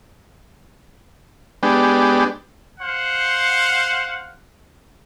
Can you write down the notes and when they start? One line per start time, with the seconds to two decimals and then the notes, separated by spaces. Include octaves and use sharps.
1.63 G#3 B3 D4 G4
2.81 C5 F5 F#5